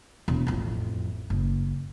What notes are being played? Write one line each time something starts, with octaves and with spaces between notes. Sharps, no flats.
E1
A1 F2
F#1